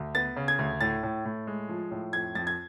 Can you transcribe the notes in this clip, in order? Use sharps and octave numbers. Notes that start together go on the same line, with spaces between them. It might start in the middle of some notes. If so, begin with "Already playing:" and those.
Already playing: D2
B3 A6
C#3
G#6
D2
A2 A6
A2
A2
G#3
F3
A2
F2 G#6
F2 A6
G#6